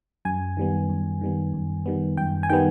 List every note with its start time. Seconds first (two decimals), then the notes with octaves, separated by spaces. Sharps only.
0.25 F#2 G#5
0.57 D#3 G3 B3
0.89 F#2
1.21 D#3 G3 B3
1.54 F#2
1.86 D#3 G3 B3
2.17 F#2 G5
2.43 G#5
2.50 D#3 G3 B3 G5